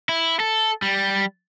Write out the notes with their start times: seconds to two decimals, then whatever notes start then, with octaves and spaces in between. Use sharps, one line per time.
0.09 E4
0.40 A4
0.82 G3